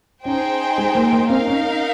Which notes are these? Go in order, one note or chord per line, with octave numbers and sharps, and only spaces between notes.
C#4 D#4 G#4 C5 G5
G#3
A#3
A#3
C4 D#4 A#4 F5
C#4